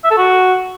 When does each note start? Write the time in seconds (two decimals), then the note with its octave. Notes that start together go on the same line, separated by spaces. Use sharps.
0.04 E5
0.11 A4
0.17 F#4